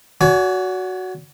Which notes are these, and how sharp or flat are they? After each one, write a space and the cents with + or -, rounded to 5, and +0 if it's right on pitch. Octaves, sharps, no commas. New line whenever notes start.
F#4 +0 D5 -45 G#5 +20